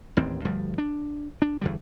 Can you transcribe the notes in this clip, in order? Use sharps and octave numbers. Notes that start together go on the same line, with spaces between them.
A1 D#2 A2 C4
D2 G2 F3 G3
D4
D4
E2 D3 G3